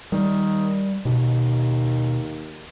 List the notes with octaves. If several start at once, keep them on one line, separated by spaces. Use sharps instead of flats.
D#3 G3
D#2 B2